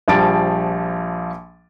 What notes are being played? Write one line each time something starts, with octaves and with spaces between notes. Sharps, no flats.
A#1 F3 G3 A5 A6 D7